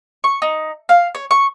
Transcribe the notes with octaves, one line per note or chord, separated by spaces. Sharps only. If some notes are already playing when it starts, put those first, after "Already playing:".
C#6
D#4
F5
C#5
C#6